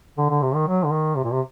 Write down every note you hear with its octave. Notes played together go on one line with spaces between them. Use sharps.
D3
D3
C3
D#3
F#3
D3
D#3
C3
A#2
C3